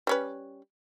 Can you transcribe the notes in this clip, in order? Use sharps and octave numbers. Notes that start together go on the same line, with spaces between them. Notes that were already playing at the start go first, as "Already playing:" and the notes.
G3 C#4 B4